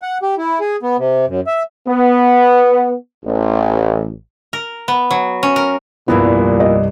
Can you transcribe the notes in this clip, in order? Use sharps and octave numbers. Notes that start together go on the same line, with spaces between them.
F#5
G4
E4
G#4
B3
C3
F#2
E5
B3
A1
A#4
B3
F#3
C#4
A#4
F1 C2 G2 A#2 B3 E4
D#5